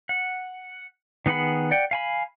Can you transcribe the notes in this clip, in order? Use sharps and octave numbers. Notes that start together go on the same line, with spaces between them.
F#5
D#3 B3 G#4 F#5 B5
D5 F#5 G5
F5 G#5 B5